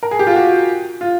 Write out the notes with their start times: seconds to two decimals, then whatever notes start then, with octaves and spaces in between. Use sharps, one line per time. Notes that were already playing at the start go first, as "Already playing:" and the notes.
0.03 A#4
0.11 G#4
0.19 G4
0.27 F4
0.36 F#4
1.01 F4